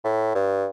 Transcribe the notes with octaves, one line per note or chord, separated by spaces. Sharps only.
A2
G2